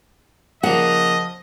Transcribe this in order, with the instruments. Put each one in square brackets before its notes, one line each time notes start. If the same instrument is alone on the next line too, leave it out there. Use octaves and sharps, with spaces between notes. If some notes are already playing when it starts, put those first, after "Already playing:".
[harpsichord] A#2 C#3 A#3 [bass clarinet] F3 [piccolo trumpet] D#5 [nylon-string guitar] F#5